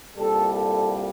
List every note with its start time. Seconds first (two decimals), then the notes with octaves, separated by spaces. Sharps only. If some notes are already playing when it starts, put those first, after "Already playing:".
0.18 C2 A#2 G3 A4
0.50 A4